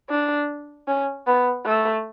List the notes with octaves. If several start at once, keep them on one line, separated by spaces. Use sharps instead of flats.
D4
C#4
B3
A3